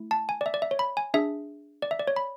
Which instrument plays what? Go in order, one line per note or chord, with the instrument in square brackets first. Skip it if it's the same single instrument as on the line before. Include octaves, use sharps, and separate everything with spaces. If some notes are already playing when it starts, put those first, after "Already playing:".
Already playing: [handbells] A3 E4
A5
G#5
D5
E5
D5
E5
C#5
B5
G#5
D4 G#4 E5
D5
E5
D5
C#5
B5